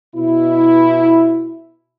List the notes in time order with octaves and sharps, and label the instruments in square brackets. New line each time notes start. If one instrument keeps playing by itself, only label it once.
[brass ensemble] B2 E4